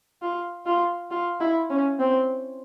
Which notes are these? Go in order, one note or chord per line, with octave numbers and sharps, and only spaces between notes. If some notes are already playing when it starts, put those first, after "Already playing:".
F4
F4
F4
E4
C#4
C4